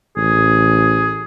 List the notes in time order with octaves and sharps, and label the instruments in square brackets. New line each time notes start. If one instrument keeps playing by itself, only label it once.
[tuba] A1 [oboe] G#4